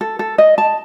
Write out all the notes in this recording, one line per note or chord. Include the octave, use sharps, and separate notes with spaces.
A4
A4
D#5
A5